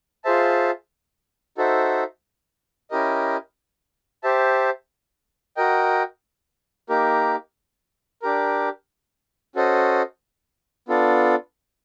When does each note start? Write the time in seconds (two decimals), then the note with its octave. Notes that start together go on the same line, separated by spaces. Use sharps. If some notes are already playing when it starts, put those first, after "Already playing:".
0.24 F4 G#4 C5 E5 A5
1.58 D#4 F#4 A4 C5 E5
2.91 C#4 E4 G4 A#4 D#5
4.23 G4 C5 E5 A5
5.57 F#4 A#4 D#5 G5
6.89 A#3 D#4 G4 A#4
8.22 D4 G4 A#4
9.55 C#4 F#4 A4 C5 D#5
10.88 B3 D4 F4 A4